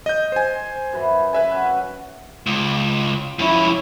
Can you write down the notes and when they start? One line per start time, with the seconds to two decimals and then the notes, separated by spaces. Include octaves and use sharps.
0.06 D#5 G6
0.32 C5 G#5
0.93 F#2 E3
1.33 B4 E5 G#5
1.51 C#4 F#4
2.46 C#2
3.39 F2 C#4 E4